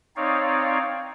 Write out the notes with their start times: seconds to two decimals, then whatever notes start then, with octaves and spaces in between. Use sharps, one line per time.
0.16 C4 D#4 C#5 D5 F5